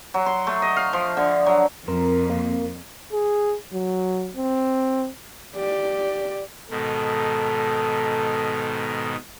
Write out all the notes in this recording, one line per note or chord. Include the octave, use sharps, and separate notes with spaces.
F#3
C6
A3
D#5
F5
F3
D3
F#3
F2 C4 A#4
A#3
G#4
F#3
C4
G4 D5
G#2 B2 D#3 A4